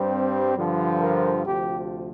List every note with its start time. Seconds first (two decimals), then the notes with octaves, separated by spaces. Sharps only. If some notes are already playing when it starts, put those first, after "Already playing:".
Already playing: G2 G3 C4
0.55 G2 D3 F3
1.00 A#4
1.45 D2 C3 F3 G4